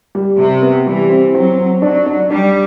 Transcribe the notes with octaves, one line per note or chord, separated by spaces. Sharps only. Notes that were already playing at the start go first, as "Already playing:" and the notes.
G3
C3 G3
B3
E3 G3
C4
F#3 C4
C4
F#3 D4
D4
G3 D4